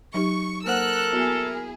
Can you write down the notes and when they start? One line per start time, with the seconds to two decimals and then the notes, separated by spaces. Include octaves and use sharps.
0.14 F#3 D#4 G4 C#6
0.66 A#3 A4 A#4 C5 F#5 E6 F#6
1.13 B3 E4 F#4 G#4